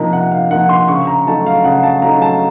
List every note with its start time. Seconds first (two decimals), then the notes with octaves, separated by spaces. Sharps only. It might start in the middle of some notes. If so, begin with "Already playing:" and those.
Already playing: C3 F3 A#3 D#4 A#5
0.13 C3 F#5
0.31 F5
0.51 F3 A#3 D#4 F#5
0.69 C6
0.88 C#3 C#6
1.07 A#5
1.26 F#3 A3 D#4 A5
1.46 F5
1.64 C#3 F#5
1.83 A5
2.02 F#3 A3 D#4 A#5
2.22 A5